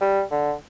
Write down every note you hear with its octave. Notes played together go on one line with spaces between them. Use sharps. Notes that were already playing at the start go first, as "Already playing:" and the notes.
G3
D3